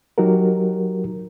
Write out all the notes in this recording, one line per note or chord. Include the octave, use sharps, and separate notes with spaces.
F#3 D#4 F#4 G4 A#4